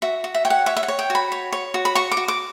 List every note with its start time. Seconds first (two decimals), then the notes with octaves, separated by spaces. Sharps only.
0.02 F#4 E5
0.24 F#4
0.34 E5
0.45 C#5 G5
0.50 F#5
0.66 C#5 E5
0.77 E5
0.83 F#5
0.88 C#5
0.99 G5
1.10 F#4 B5
1.32 C#5
1.52 C#5
1.74 F#4
1.85 B5
1.95 F#4 C#6
2.12 D6
2.17 F#4
2.28 D6